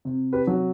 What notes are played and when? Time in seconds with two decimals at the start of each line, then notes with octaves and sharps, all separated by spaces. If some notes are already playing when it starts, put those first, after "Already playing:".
0.05 C3
0.33 G4 B4
0.47 F#3